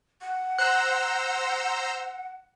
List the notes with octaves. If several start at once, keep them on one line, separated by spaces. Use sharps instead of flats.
F#5
C5 A#5 E6 F#6